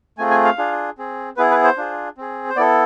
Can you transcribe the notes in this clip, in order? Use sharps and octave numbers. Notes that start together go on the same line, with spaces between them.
A3 C4 F4 G#4 G#5
G#5
F5
D4 F4 G#4
C4 G#4
B3 E4 G#4 B4
B4
C5
D4 F4 G#4
C4 G#4
C5
B3 E4 A4 D5